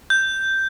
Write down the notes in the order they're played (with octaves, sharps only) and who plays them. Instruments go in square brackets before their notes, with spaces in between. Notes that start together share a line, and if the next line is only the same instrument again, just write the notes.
[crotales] G6